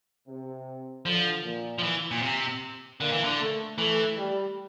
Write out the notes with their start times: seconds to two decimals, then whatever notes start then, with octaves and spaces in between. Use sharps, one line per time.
0.28 C3
1.06 D3 F3
1.45 A#2
1.79 F3
1.83 E3
2.11 A#2
2.22 C3
3.00 D3 A#3
3.12 E3
3.24 D3
3.39 A3
3.78 E3 A3
4.17 G3